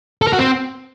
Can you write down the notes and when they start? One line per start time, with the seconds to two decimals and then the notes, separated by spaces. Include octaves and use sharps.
0.22 A4
0.27 A#4
0.33 F#4
0.39 C4